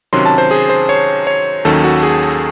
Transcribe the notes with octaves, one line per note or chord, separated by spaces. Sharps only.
C3 D#3 F#3 C#4 C6
A5
C5
G#4
C5
C#5
C#5
D#2 D#3 F#3 C#4 A4
F#4
G#4